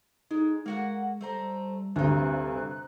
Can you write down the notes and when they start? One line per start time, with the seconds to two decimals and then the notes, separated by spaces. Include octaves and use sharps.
0.31 G#3 D#4
0.66 G#3 A#3 F#4 F#5
1.21 G3 A3 C5 A#5
1.96 D2 G2 C3 C4 D#4 F#6